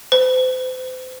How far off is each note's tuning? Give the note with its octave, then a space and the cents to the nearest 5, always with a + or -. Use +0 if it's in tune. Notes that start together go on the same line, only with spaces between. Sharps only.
C5 -35